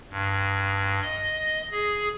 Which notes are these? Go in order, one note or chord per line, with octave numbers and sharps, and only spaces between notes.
G2
D#5
G#4